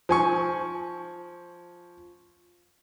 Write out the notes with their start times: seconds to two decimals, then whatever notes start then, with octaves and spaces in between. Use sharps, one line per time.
0.09 F3 G#5 C#6